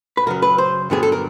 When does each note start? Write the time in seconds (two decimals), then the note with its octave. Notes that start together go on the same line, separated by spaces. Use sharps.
0.17 B4
0.26 F#2 C#3 F#3 A#4
0.42 B4
0.58 C5
0.90 G2 D3 F#3 B3 G#4
1.03 A4
1.12 A#4